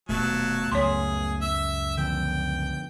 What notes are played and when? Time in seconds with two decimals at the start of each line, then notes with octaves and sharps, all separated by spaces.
0.09 D#1 B2 F#3 A3 B3 A5
0.72 C#2 F#2 G3 G#4 C#5 C6
1.41 E5
1.98 D3 F3 B3 G5